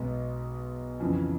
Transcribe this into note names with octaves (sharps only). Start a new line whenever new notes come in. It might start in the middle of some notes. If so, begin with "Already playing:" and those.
Already playing: B1 B2 G#3 B3
F2 C#3 E3